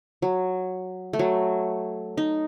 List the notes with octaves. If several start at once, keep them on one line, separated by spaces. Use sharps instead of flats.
F#3
A3
F#3
D#4